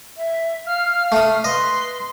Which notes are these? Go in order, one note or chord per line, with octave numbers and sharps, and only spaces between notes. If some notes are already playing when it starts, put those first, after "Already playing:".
E5
F5 F6
A3 D#6
B4 D#5 C6